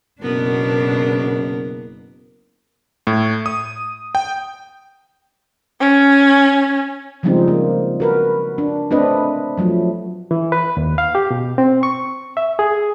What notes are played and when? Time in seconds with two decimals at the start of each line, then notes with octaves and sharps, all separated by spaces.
0.22 F#1 B2 B3 D4 A#4
3.07 A2
3.46 D#6
4.15 G5
5.81 C#4
7.23 C#3 F3 G3 G#3 C4 D#4
7.48 A#3
8.00 F#4 A#4 B4
8.58 D4
8.91 A3 C4 D4 B4 D#5
9.57 F3 F#3 A3
10.31 E3
10.52 B4
10.77 D#2
10.98 F5
11.15 G4
11.31 B2
11.58 C4
11.83 C#6
12.37 E5
12.59 G#4